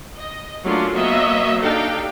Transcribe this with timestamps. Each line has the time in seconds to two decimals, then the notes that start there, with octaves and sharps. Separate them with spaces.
0.17 D#5
0.65 F#3 A3 A#3 C#4 D4 F4
0.94 F#3 A#3 B3 C#5 D#5 E5
1.60 D4 D#4 G4 A4 F5 G5